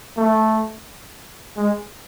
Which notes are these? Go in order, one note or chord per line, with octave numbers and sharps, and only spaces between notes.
A3
G#3